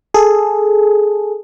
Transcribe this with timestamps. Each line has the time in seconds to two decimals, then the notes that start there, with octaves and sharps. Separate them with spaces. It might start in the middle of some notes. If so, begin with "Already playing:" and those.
0.14 G#4 A4